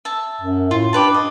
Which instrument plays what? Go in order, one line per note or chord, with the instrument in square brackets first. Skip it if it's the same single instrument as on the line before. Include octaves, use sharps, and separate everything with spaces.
[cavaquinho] E5 A5
[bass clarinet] F#2
[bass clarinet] A2 [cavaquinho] F4
[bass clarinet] D4 [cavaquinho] G4 B4 A5
[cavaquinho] D#5